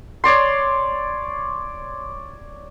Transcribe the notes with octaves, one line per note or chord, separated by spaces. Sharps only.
C#5 D5 C6